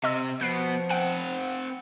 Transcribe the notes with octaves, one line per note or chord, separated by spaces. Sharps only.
C3 D#5 C6 E6
B2 F3 B3 F#6 C7 D7
C4 F#5 G5